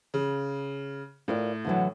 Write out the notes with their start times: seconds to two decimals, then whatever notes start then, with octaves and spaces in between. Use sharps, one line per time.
0.14 C#3
1.28 A2 F4 A#4 D5
1.65 D3 E3 F#3